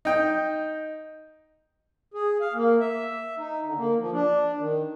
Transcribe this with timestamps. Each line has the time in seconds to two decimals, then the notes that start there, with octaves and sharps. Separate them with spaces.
0.05 D#4 G5
2.14 G#4
2.41 F5
2.54 A#3
2.80 E5
3.38 D#4
3.65 D3
3.78 A#3
3.99 F3
4.12 D4
4.59 D#3